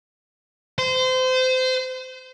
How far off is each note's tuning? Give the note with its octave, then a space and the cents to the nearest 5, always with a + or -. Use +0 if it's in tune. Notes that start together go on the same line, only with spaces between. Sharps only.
C5 -25